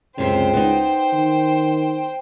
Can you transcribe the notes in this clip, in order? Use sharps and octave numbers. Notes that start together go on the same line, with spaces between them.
C#2 F#2 C3 C5 G5
B3 D#4
D#3